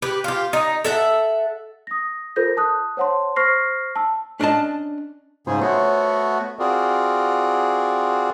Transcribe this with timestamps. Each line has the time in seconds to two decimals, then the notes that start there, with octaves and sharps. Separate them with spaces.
0.02 G4 B4
0.24 F4 G4
0.53 D#4
0.85 A4 E5 F#5
1.87 D#6 A#6
2.36 F4 A4 A#4 C5 G6 A#6
2.57 A5 D#6 F#6
2.97 C5 C#5 F#5 A5 C6
3.36 C5 C#6 F6 A#6 C7
3.96 A5 E6
4.40 C#4 D4 D5 D#5 A5
5.47 G#2 C#3 G#4 C5
5.61 A3 B3 F#4 C#5
6.59 C4 F4 F#4 G#4 A#4 D5